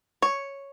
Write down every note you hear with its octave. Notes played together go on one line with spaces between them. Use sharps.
C#5